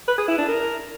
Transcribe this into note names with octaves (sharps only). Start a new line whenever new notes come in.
B4
G#4
E4
D4
A#4